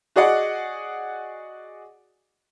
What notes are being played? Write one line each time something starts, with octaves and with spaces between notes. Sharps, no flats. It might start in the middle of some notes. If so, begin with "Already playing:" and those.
F#4 G#4 D5 D#5 F#5